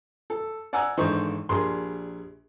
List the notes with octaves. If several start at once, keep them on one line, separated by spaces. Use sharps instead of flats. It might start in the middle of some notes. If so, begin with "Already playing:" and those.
A4
D5 F#5 G#5 A#5 E6
G#1 D3 E3 D#4 C5 C#6
A#1 G3 G#4 A#4 C6